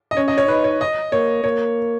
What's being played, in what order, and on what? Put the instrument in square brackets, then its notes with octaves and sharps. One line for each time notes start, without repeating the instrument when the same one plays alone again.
[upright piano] D#5
[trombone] C#4 [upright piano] C#5
[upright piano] D#5
C#5
[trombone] D#4 [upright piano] B4
[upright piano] C#5
D#5
[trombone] A#3 [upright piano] C#5
[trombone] A#3 [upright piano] C#5